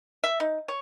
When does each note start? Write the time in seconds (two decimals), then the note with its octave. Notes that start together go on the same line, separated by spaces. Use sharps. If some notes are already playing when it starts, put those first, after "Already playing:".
0.24 E5
0.40 D#4
0.68 C#5